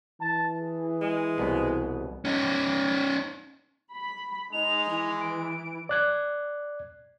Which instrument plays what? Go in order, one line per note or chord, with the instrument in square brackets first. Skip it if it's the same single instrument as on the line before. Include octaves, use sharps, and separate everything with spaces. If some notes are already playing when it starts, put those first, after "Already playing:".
[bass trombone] E3 [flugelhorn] A5
[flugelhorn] G#4
[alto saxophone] G#3
[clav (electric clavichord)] C2 B2 B3
[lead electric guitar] C#4 D#4
[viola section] B5
[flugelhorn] G#3 [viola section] D#4 [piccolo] F7
[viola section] E3
[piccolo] D7
[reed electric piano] D5 F#6 G#6